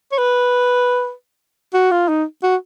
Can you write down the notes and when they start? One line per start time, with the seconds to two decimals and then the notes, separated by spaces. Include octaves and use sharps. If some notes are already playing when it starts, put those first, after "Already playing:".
0.12 C#5
0.18 B4
1.74 F#4
1.91 F4
2.08 D#4
2.43 F#4